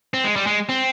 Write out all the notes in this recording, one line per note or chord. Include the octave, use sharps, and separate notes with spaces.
C4
G#3
G3
G#3
C4